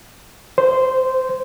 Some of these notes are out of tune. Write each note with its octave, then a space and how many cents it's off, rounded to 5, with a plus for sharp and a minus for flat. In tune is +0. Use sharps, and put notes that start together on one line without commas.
C5 -10